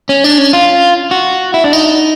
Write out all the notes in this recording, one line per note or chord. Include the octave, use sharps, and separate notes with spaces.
C#4
D4
C#4
F4
F#4
E4
D4
D#4